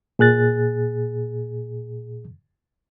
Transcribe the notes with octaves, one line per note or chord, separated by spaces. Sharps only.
A#2 G#4 F#6 A6